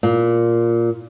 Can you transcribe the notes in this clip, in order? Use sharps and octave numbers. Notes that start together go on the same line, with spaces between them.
A#2